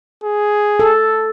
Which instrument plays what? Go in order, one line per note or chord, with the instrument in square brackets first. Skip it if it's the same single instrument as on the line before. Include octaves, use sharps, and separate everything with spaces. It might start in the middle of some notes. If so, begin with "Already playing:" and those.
[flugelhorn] G#4
[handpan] A4